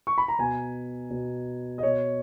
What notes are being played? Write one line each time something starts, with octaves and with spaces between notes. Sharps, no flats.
C#6
B5
A#5
B2 G#5
B2
D#5
B2 C#5